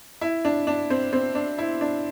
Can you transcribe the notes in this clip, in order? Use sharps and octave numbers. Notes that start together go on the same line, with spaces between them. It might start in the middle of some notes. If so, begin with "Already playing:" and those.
E4
D4
D4
C4
C4
D4
E4
D4